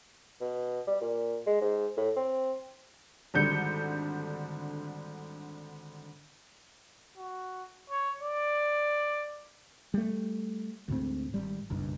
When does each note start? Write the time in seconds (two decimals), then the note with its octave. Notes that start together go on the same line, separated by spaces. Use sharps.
0.41 B2
0.87 G3
1.01 A#2
1.46 G#3
1.61 G#2
1.97 A2
2.16 C4
3.34 G#1 D3 G3 G6 C#7
7.17 F#4
7.90 C#5
8.21 D5
9.94 G3 A3
10.88 D2 G#2 C4
11.34 G#1 G3
11.70 F#1 B1 G2